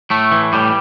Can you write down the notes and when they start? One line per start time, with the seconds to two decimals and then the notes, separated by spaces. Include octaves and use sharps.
0.10 A2 A3
0.32 E3
0.53 A2 G3